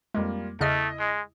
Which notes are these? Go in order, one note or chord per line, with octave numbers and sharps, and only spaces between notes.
F2 G3 G#3 A#3 F4
E2 C#3 A3 E4 D#5 F6
G#3